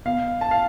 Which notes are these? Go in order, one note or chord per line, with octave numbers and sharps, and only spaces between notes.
B2 F5
A5
F5